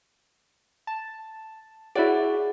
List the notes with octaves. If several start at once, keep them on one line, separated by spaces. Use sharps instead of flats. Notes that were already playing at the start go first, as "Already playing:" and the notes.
A5
E4 F#4 G#4 C#5 D5 F#5